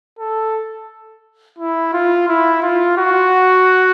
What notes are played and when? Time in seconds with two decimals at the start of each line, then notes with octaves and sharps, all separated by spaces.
0.19 A4
1.58 E4
1.93 F4
2.28 E4
2.62 F4
2.98 F#4